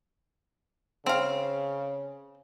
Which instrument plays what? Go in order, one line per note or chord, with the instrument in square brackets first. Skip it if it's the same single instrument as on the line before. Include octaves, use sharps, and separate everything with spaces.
[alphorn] C#3 [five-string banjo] C4 F5